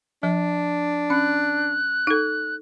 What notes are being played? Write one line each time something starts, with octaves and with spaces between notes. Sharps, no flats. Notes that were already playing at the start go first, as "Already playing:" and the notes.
F3 D4
C#4 F#6
D#4 A4